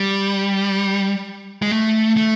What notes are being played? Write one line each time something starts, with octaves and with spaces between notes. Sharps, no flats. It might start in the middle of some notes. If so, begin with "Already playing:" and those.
Already playing: G3
G#3
A3
A3